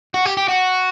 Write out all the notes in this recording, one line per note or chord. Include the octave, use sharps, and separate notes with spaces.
F#4
G4
G4
F#4